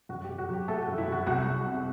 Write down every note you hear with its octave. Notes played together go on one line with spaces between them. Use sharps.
F#2 F#4
G4
F#2
F#4
F#3
G4
A3 A4
F#4
F#2
E4
F#2 F#4
C2 F#4
C2
C3